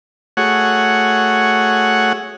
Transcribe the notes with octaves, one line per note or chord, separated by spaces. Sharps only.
A3 F#4 G#4 C#5 F#5